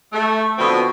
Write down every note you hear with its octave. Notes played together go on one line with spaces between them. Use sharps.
A3
B2 D3 F3 B3 C4